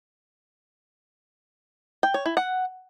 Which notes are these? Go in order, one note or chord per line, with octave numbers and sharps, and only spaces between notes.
G5
C#5
E4
F#5